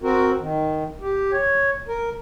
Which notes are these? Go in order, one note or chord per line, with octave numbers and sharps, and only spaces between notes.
C4 F#4 A#4
D#3
G4
C#5
A#4